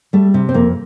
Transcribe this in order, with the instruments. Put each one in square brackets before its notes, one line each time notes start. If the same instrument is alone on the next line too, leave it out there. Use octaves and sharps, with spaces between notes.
[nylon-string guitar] G3 A3
C3
C4
F2 A#3